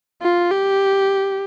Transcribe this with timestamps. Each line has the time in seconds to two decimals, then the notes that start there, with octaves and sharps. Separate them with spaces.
0.22 F4
0.51 G4